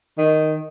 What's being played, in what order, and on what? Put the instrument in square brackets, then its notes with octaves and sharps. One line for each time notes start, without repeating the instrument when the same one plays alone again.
[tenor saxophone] D#3